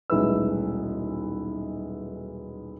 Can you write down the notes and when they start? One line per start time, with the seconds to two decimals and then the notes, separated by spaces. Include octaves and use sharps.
0.10 D#1 B1 G#3 E4 B4 E6